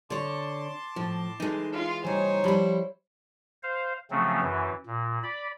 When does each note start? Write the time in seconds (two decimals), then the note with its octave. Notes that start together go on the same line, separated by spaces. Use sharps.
0.10 D3 C#5 A5 C6 D6
0.96 A2 F3
1.40 E3 G#3 D#4 A4
1.73 F4 F6
2.05 E3 G3 D#4 C5 C#5 G#5
2.44 F3 G3 E4 B5
3.63 C5 F5
4.11 C#3 F3 F#3 A3 C4 C#4
4.42 F#2 E3
4.86 A#2
5.24 D5 B5